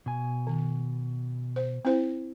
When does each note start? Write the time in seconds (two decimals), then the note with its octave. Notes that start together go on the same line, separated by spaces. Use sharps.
0.06 B2 G#5
0.47 D#3
1.56 C5
1.85 C4 E4 C5